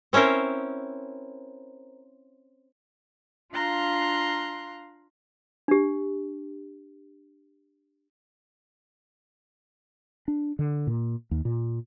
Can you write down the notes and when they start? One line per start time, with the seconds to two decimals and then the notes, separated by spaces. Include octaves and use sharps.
0.13 C4 C#4 E4 A#4 C5
3.51 D4 F4 F5 A#5 C6 F#6
5.68 D4 G4
10.28 D4
10.59 D3
10.87 A#2
11.31 D#2
11.45 A#2